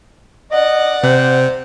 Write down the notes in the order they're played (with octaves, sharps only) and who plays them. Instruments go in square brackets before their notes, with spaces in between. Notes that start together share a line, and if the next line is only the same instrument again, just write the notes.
[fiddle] D5 F#5 [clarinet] D#5
[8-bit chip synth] C3 [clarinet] C5